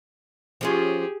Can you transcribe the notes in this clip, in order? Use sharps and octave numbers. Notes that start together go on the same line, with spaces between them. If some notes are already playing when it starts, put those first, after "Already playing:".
F3 C#4 F4 G4 G#4